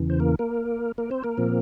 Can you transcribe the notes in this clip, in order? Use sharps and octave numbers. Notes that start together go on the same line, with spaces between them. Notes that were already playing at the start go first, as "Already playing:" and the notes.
Already playing: E2 C#3 E3
C5
A#3 A#4
A#3 A#4
A#3 A#4
C4 C5
A#3 A#4
A#2 F3 C4